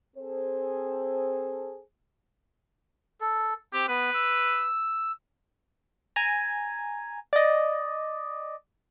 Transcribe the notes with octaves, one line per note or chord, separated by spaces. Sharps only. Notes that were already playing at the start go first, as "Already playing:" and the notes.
C4 G#4 A4 C5
A4
C4 G4
B3 B4
E6
G#5 A#5
D5 D#5